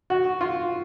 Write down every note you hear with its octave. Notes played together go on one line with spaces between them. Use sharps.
F#4
F4